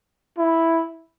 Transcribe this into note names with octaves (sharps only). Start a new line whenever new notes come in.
E4